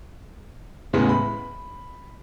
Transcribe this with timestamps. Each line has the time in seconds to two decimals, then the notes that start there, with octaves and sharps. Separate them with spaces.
0.93 E2 A2 C#3 G#3 B3
1.09 B5